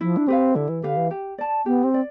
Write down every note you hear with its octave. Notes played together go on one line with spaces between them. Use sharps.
F3 E4
D4
C4 G4 B4 F5
D3 E4
E3
D3 G4 B4 F5
E3
G4
D5 A5
B3 G4
C4
D5